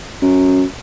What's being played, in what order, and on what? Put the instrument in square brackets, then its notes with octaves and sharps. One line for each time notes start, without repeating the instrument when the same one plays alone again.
[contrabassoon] F#2